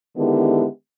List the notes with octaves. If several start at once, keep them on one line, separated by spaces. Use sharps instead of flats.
D3 D#3 G#3 B3 E4 G4